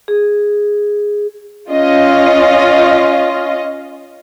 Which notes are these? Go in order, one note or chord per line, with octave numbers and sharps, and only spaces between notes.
G#4
C#4 F4 D#5